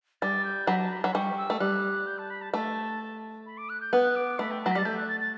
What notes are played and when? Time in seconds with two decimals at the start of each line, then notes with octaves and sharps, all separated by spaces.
0.22 G3 A6
0.45 G6
0.67 F#3 B5
0.79 A5
0.91 B5
1.03 F#3 B5
1.14 G3 C#6
1.38 E6
1.50 A3
1.60 G3 F#6
2.07 G6
2.18 A5
2.30 B5
2.42 A5
2.53 A3 A5
3.46 B5
3.58 D6
3.69 F#6
3.81 G6
3.93 B3 F#6
4.16 D6
4.39 A3 B5
4.51 G5
4.62 F#3 A5
4.71 B6
4.75 G3 A6
4.85 A3 G6
4.97 F#6
5.09 A6
5.20 A6